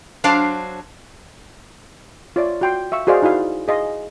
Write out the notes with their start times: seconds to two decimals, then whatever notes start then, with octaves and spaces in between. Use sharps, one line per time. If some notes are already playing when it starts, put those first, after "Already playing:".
0.24 F#3 D4 C5 F5 A5
2.36 F4 C#5 D5 E5
2.61 F#4 G5 C6
2.92 E5 F5 C#6 E6
3.07 F#4 G#4 C5 D5 D#5 F5
3.22 D#4 E4 F#4 F5
3.68 G#4 D#5 F5 C6